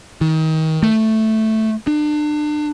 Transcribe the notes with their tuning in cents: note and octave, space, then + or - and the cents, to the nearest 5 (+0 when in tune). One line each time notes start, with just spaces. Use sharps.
D#3 +30
A3 +0
D4 +35